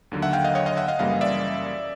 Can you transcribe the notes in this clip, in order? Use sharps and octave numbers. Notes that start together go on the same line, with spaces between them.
D#2 D3 F#3 A#3
E5 F#5
F5 G5
D#5 F5
C#5 D#5
D#5 F5
E5 F#5
D#5 F5
F#2 C#3 E3 G3 A#3 D#5 F5
D5 E5